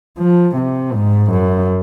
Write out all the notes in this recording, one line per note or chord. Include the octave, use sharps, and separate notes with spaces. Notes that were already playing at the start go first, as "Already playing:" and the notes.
F3
C3
G#2
F#2